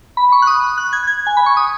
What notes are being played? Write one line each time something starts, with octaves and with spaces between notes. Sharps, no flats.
B5
C#6
F#6
D#6
F#6
G#6
G#6
G#5
B5
C#6
D#6